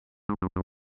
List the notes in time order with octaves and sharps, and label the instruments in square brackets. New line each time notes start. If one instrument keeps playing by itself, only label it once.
[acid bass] G#2
F#2
F#2